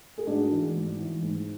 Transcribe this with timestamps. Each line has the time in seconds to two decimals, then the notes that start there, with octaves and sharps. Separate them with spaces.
0.18 G#4
0.27 G#2 D4 F#4
0.52 E3
0.75 G#2
0.99 E3
1.22 G#2